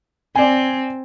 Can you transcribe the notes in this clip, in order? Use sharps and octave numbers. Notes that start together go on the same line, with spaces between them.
C4 D5 G#5